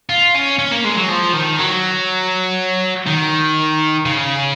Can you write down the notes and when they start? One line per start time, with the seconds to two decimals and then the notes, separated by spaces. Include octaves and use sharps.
0.10 F4
0.35 C#4
0.59 C#4
0.72 A#3
0.84 G#3
0.97 F#3
1.09 F3
1.34 D#3
1.59 F#3
3.07 D#3
4.06 C#3